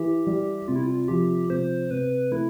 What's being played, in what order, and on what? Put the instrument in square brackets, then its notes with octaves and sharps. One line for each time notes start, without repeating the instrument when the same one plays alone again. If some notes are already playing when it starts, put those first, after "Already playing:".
Already playing: [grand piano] E3 [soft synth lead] G4
[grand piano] G3
[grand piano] C3 [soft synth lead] F4
[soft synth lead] E4
F4
[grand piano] F3 [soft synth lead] G4
[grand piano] C3 [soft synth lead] C5
[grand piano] C3 [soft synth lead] B4
[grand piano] A3 [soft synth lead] E4